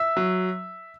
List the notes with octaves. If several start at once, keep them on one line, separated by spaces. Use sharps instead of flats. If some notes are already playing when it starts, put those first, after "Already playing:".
Already playing: E5 E6
F#3